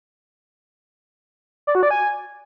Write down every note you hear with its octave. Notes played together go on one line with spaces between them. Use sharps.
D5
F#4
D5
G#5